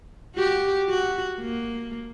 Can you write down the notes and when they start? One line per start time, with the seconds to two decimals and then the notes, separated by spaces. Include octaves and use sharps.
0.36 F#4 G4
0.89 F#4
1.41 A#3